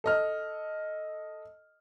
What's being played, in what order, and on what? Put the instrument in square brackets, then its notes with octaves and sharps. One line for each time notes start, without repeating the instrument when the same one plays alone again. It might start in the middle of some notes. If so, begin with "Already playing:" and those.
[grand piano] A4 D#5 F6